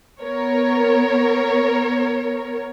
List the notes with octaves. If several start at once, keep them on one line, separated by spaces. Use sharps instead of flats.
B3 A#4 C#5